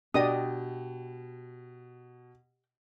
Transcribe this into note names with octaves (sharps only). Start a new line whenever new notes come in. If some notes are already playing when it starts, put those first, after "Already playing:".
B2 D4 G4 D5 D#5 G5 D#6